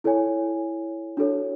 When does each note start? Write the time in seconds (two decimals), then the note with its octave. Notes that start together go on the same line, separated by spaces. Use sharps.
0.04 E4 A4 C#5 G#5
1.17 D4 F#4 A4 C#5